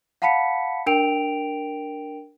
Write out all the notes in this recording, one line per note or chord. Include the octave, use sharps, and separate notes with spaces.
F5 F#5 A5 B5 B6 C#7
D4 A#4 G5 D7 F7